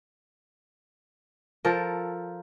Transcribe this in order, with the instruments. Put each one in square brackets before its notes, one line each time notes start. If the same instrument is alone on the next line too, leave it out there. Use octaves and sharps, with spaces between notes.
[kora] F3 A4 A#4